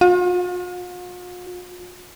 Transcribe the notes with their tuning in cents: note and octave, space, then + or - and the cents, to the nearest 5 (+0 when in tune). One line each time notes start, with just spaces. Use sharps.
F4 +45